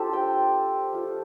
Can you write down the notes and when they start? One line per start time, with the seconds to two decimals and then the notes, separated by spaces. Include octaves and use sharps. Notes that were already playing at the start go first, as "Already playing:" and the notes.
Already playing: A3 D4 F4 G4 A4 C5
0.13 G5
0.92 A3 F4